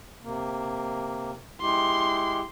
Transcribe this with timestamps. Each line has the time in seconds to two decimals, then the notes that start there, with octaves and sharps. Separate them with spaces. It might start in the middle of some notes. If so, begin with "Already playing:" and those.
0.23 C3 A#3
1.61 G#3 E4 G4 C6